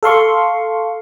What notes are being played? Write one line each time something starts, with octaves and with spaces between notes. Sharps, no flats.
A4 F5 C6 C#6